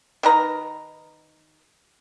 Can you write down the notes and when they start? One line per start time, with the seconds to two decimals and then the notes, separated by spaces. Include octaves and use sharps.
0.23 D#3 B4 A#5